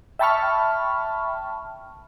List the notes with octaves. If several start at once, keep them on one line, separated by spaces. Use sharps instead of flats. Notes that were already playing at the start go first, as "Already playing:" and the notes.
E5 G5 A5 B5 C#6 F6